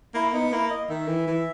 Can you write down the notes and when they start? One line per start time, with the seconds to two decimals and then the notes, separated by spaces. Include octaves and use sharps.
0.14 A#3 E4
0.33 B3 D#4
0.52 A#3 E4
0.70 D#5
0.89 D#3 E5
1.08 E3
1.27 E3